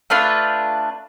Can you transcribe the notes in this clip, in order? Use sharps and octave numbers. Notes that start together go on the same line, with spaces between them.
A3 D4 F4 B4